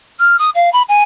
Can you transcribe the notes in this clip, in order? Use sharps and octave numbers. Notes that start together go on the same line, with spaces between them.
F6
D#6
F5
B5
G#5